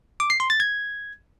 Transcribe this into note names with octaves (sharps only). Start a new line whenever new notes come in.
D6
C7
C6
A6
G#6